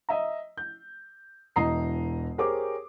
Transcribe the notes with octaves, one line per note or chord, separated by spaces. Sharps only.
D#5 E5 A#5
G6
E1 E3 D#5 A#5 D#6 C7
G4 G#4 A#4 C5 C#5 D6